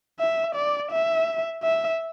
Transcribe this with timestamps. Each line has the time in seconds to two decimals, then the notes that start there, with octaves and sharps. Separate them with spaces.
0.20 E5
0.55 D5
0.92 E5
1.63 E5